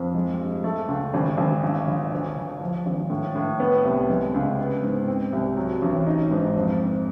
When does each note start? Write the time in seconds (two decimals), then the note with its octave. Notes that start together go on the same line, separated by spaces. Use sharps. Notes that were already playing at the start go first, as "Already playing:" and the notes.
Already playing: F2
0.15 G#3
0.40 G2
0.64 A3
0.88 C#2
1.14 G#1
1.37 G#1
1.63 G1
1.87 G1
2.12 D2
2.36 D2
2.61 F3
2.86 G#1
3.10 A2
3.35 A2
3.60 B3
3.85 C2
4.10 G#3
4.34 C#2
4.58 B3
4.83 G#2
5.08 C4
5.33 C2
5.57 F#3
5.82 A1
6.07 D#4
6.31 G#2
6.56 F2
6.81 F2